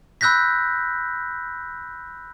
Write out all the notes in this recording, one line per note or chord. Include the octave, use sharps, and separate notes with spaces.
B5 E6 F#6 G6 A#6 B6